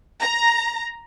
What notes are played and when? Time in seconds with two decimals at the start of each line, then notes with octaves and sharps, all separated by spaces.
0.21 A#5